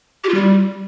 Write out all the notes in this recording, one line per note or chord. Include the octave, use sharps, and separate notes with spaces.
G4
F4
G3